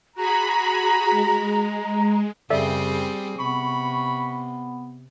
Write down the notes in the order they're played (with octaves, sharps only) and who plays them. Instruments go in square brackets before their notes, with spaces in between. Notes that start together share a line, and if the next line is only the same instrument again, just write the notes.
[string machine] F#4 G#4 B5 [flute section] A#5
[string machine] G#3
[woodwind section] F#2 C#3 [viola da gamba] G3 C4 G#4 [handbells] A4 D5 E5
[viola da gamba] C3 [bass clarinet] B3 [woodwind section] B5 C#6